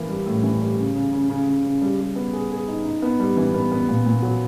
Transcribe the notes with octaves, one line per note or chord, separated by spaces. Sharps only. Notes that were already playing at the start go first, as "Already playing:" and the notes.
Already playing: E3 A#3
G3
A2
E3
G3
C#3
C#3
C#3
C#3
C#3
C#3
G3
G3
B3
G#4
G#4
D#4
D#4
B3
G3
E3
B3
B3
A#2
A#2
F#3